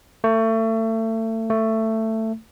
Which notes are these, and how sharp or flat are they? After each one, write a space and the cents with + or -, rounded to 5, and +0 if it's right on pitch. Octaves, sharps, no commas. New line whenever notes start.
A3 +30
A3 +15